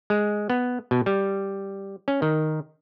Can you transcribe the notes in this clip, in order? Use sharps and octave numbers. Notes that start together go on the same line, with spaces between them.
G#3
B3
B2
G3
C#4
D#3